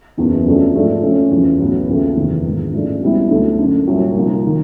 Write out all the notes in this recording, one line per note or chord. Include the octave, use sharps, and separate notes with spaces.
F#1 E2 B2
F2 C#3 F#3 A3 D4
G#2 F3 A3 D4
F2 C#3 F3 A3 C#4
E2 C#3 F3
B1 A2 F#3 B3
D#2 C#3 F3 A3
F#1 E2 C3 D#3
A#1 G#2 D#3
A1 G#2 F3 A3 D4
C#2 B2 G3 C4 E4
D2 D3 F#3 A3
F#1 F#2 D3
C2 A#2 F#3
C2 C3 F3 A#3 D#4
D#3